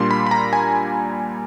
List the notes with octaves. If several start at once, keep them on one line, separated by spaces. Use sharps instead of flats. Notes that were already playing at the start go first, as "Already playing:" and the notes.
Already playing: A#2 G3 A#3 D4 C6
B5
B5
A#5
G#5